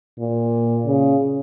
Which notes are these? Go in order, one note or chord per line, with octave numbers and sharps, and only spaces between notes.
A#2
C#3